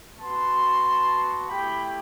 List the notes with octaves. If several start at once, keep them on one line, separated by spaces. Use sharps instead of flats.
B3 F#4 A5 C6
A3 E4 G4 G5 B5